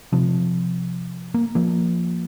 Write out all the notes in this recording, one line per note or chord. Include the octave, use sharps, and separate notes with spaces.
C3 F3
A#3
F3 A#3